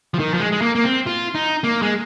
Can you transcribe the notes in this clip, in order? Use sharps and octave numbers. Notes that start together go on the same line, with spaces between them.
F3
D#3
F3
G#3
G#3
A#3
A#3
C4
F4
D#4
A#3
G#3